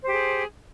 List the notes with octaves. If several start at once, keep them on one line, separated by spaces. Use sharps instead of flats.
G4 G#4 C5